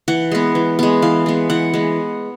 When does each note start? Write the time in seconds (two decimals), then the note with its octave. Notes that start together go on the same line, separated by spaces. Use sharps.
0.08 E3 F#5
0.32 G#3 B3
0.55 E3
0.79 G#3 B3
1.02 E3 F5
1.26 G#3 B3
1.50 E3 F#5
1.74 G#3 B3